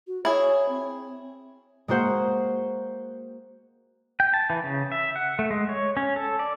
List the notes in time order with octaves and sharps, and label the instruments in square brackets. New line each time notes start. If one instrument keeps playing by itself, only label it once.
[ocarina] F#4
[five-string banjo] E4 G#4 [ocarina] C#5
[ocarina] C4
[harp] G#3 A#3 F#4 C5 F#5
[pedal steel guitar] G5
A5
E3
C#3
E5
F#5
A3
G#3
C#5
C#4
A4
D5